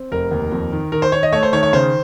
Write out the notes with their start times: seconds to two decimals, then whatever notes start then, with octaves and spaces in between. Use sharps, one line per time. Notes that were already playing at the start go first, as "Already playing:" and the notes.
Already playing: C4
0.11 F1 A#4
0.31 D#2
0.52 F2
0.72 D#3
0.92 D#3 A#4
1.02 C5
1.12 D#3 C#5
1.23 D#5
1.32 A3 C#5
1.43 C5
1.52 D#3 C#5
1.63 C#5
1.73 C#3 C5